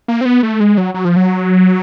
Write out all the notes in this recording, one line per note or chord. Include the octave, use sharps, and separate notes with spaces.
A#3
C4
B3
A3
G#3
F#3
F#3
F3
F#3